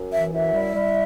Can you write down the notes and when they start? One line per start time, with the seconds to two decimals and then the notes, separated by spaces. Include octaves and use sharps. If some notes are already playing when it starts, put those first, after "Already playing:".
Already playing: F#2
0.13 E3 E5
0.32 F#2 E4 E5
0.52 G3
0.73 G3